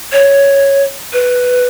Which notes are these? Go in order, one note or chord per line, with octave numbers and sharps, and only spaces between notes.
C#5
B4